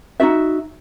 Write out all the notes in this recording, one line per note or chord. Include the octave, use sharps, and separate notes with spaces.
D#4 F4 F#4 E5